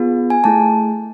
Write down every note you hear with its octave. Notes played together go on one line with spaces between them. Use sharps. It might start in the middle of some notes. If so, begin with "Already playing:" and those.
Already playing: B3 F4 G#4
G#5
A3 E4 G#4 A5